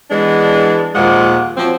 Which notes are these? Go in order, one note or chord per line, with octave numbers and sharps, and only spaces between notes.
E3 G#3 B3 D4
D#2 A#2 F3 G#3 F#5
F3 F#3 C4